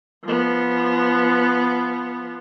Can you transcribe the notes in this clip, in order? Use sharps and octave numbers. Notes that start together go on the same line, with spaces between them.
F3 B3